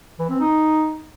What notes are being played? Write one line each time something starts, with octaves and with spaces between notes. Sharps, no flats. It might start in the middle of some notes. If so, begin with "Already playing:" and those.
E3
C4
D#4